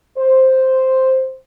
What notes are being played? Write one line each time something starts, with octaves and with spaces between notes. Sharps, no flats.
C5